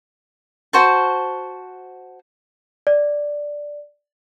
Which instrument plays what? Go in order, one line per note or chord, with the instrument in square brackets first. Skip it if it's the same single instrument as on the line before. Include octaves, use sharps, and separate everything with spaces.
[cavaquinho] F#4 C5 A5
[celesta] D5